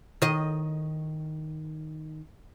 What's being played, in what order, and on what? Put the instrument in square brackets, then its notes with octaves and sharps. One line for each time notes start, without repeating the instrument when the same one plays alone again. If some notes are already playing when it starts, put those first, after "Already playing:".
[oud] D#3 D#5